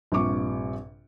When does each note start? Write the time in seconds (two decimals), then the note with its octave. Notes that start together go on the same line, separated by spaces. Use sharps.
0.12 A#1 G2 C3 F4 C#6 D6